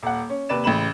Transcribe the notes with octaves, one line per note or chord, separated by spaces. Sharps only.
D#1 F#5
C#4
D#2 C3 B4 D5 E7
A1 C#3 E3 B5 E7 F#7